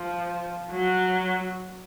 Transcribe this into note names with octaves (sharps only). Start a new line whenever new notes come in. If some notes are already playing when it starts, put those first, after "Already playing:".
Already playing: F3
F#3